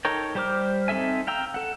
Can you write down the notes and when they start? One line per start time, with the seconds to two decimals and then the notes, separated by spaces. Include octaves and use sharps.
0.05 D#4 A4 A#4 C#5 G5
0.35 G3 G4 C5 D6 F6
0.88 C4 D#4 A4 E5 G#5
1.27 F5 G5 A#5 E6
1.54 A4 F#5